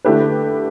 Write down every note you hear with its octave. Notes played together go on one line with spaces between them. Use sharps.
D3 A3 E4 G4 B4